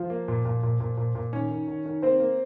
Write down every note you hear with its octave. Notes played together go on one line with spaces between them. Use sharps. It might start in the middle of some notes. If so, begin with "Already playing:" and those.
Already playing: F3 F4
A#3
A#2
A#2
A#2
A#2
A#2
A#2
D#3 C#4 C#5
D#3
D#3
D#3
A#3 C4 C5
A#3